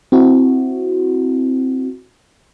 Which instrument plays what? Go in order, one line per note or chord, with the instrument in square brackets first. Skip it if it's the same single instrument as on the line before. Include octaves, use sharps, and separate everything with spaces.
[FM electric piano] C4 E4 F#4